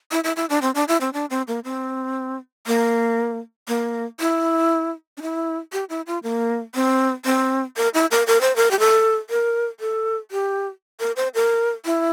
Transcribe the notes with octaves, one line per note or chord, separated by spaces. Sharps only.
E4
E4
E4
D4
C4
D4
E4
C4
D4
C4
A#3
C4
A#3
A#3
E4
D4
E4
G4
E4
F4
A#3
C4
C4
A#4
E4
A#4
A#4
C5
A#4
G4
A4
A#4
A4
G4
A#4
C5
A#4
E4